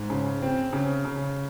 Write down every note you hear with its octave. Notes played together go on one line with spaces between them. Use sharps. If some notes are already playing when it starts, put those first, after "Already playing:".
Already playing: G#2
C#3
C4
C#3
C#3